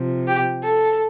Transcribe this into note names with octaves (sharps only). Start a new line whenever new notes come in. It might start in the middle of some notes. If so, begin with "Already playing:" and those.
Already playing: C3 F3
G4
A4